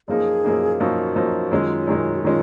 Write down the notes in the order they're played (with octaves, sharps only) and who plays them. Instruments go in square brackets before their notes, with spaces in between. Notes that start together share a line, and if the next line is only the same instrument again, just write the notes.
[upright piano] F#2 F3 A#3 D#4 [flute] G#4
[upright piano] F#2 F3 A#3 D#4
[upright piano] F#2 F3 A#3 D#4 [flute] F#4
[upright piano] F#2 F3 A#3 D#4
[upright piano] F#2 D#3 G#3 C#4 [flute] F4
[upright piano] F#2 D#3 G#3 C#4
[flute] F#4
[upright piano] D#3 G#3 C#4 [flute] F4